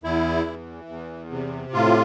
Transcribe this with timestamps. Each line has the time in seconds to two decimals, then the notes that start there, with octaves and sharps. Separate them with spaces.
0.04 E2 E4
0.47 E3
0.89 E2
1.31 C3
1.73 A2 F4